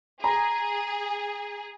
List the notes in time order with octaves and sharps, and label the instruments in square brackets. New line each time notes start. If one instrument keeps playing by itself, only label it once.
[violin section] G#4 [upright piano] A#5